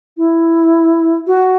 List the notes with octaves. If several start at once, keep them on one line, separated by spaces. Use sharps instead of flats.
E4
F#4